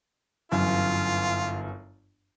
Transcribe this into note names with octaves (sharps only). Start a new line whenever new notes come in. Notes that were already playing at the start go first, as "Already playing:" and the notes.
G1 F#2 E3 F4